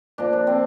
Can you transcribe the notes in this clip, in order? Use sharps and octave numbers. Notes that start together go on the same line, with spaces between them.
A#2 F3 D4
D4
C4